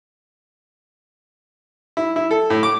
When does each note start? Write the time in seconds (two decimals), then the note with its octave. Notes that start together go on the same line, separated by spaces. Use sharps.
1.97 E4
2.16 E4
2.31 A4
2.50 A2
2.63 D6